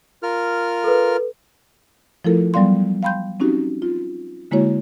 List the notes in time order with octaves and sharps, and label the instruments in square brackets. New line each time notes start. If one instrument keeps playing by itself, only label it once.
[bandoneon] F4 A#4 F6
[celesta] A4 B4
[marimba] F3 A3 E4 F4 A4 A#4
F#3 G3 B3 D5 F5 C6
F5 G5 B5 C6 G6
C4 C#4 D#4 F#4 G4
F4
D3 G#3 A#3 E4 F#4 C#5